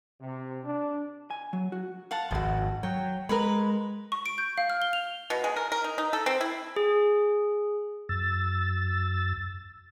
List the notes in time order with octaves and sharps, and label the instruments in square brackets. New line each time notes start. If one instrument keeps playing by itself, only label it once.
[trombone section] C3
D4
[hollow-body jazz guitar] G#5
F#3
F#4
[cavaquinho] F5 F#5 A5
[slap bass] G#1 F2 [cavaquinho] F4 F#4
[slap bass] F#3 [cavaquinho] G5
[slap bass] G#3 [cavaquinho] A#4 B4 B5
[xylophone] C#6
D7
G6
F5
F6
G7
F7
[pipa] B2
G#3
A#4
A#4
D#4
D#4
A4
C4
E4
[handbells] G#4
[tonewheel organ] F#2 E6 A6